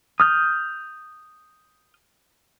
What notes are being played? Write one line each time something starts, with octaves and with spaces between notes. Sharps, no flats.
D#6 F6 G6